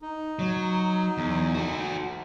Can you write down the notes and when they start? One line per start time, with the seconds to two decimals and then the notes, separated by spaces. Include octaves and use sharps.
0.02 D#4
0.39 F#3
1.18 E2
1.54 F#4 A4